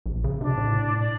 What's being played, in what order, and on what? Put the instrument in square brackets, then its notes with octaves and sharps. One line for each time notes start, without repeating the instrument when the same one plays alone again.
[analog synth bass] A#1
C#3
[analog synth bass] C3 [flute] D4
[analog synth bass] A2
[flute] D5